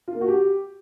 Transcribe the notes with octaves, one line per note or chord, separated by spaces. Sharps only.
F4
A#3
F#4
G4